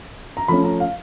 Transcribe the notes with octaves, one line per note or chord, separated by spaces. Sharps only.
A#5
F3 A3 C#4 B5
A#5
F5